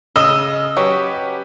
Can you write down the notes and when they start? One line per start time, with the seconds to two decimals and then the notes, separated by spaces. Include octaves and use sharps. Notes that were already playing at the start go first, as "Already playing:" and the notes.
0.16 C#3 D#5 E6
0.77 F#3 C#4 G4 B4